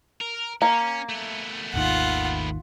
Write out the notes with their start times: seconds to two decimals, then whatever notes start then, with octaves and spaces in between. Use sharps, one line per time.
0.21 A#4
0.62 A#3 C#4
1.09 A3 B3
1.74 G#1 D#2 D#3 F4 F#5